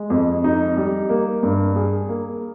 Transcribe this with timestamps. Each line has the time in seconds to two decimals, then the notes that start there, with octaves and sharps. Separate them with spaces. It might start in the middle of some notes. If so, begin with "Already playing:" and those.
Already playing: G#3
0.10 F2
0.44 D#4
0.77 G3
1.09 A#3
1.43 G2
1.76 G#4
2.09 A#3